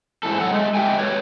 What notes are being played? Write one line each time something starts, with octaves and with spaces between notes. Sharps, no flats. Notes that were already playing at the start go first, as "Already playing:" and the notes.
G#2 E3 A4
F#3 A4 F#5
G#3 A3
G#3 G4 E5 G5 G#5
A3 B4 C#5